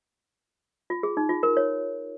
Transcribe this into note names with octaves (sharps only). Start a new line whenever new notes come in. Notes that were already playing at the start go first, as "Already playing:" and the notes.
F4
G#4
D#4
F4
A#4
C#5